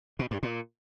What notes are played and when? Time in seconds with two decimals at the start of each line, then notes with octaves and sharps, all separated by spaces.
0.19 B2
0.31 G2
0.43 A#2